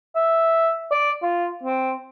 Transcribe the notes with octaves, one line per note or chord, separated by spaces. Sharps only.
E5
D5
F4
C4